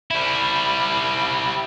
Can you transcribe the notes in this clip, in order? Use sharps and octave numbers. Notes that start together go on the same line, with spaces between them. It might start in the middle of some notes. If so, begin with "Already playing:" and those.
G3 E4